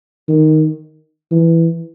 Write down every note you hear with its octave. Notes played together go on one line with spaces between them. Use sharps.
D#3
E3